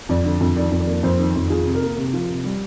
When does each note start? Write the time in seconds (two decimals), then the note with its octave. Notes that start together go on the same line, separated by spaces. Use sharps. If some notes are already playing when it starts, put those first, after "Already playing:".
0.09 F2 D5
0.25 D3
0.41 F2
0.56 D#3 D5
0.72 F2
0.80 D5
0.87 A#3
1.03 F2 C5
1.19 D#3
1.35 F2
1.50 F3 G#4
1.66 C3
1.74 A#4
1.82 A#3
1.97 C3
2.13 F3
2.30 C3
2.44 G3